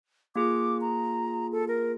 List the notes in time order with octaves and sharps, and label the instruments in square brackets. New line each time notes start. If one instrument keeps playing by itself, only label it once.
[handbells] A#3 F4 G#4 [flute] D6
[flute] A#5
A4
A#4